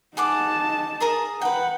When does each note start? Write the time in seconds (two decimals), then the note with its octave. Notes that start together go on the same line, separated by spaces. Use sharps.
0.17 D#4 G#4 F#5 A5 D6
1.00 G#4 A#4 D#6
1.41 B4 F#5 G5